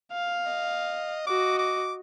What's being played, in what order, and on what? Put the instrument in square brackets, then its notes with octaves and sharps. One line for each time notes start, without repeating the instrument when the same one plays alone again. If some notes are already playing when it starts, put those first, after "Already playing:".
[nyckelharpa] F5
[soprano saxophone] D#5
[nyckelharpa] F#4 D#5 [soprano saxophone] D6
[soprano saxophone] D6